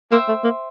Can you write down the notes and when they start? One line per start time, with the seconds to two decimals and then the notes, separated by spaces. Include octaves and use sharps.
0.12 A#3 C5 E5 G5 C6
0.28 A3
0.44 A#3